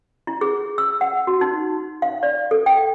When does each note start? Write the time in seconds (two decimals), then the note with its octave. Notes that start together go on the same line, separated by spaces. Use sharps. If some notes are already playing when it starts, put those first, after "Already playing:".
0.27 E4
0.41 G#4
0.78 E6
1.01 F#5
1.27 F#4
1.41 D#4
2.02 F5
2.23 D5
2.51 A4
2.66 G5